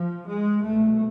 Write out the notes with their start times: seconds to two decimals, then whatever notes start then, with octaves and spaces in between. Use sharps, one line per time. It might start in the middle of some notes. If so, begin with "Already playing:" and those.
Already playing: F3
0.26 G#3
0.62 C2 B2 A3